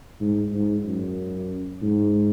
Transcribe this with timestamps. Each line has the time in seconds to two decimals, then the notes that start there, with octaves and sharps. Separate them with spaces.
0.21 G#2
0.53 G#2
0.86 F#2
1.82 G#2